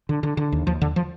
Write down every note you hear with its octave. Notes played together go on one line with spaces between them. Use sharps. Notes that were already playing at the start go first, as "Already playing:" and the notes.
D3
D3
D3
D#2
D#2 F3
D#2 D3
F3